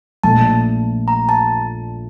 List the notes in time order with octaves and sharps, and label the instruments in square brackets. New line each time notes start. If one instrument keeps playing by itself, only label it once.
[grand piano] A#1 A#2 A3 [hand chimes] A5
[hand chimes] A#5
A5